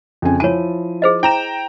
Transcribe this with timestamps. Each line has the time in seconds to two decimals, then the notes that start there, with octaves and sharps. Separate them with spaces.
0.22 F2 C#3 G#5
0.40 F3 E4 C#5 G#5 D#7
1.02 G#4 C5 D#5
1.23 E4 G5 A#5 E7